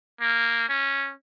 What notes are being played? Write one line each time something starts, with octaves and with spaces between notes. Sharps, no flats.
A#3
C#4